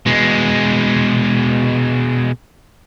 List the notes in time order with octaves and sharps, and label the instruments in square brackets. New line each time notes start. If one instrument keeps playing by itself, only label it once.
[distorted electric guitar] B2 G#3